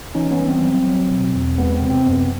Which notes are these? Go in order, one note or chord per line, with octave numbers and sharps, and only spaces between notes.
E3 C#4 D#4
B3 C#4
G3
C4
F#3
F#3
B2
E2
G#3 B3
C4
C3
C4
F#2 B3